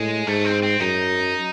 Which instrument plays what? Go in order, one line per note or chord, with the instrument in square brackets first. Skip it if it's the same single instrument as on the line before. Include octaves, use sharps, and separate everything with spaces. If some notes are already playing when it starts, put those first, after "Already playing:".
Already playing: [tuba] A2 [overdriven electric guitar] G#3
[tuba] G#2 [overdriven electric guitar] A3
[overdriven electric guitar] C4
C4
[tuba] F#2 [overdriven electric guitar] D#4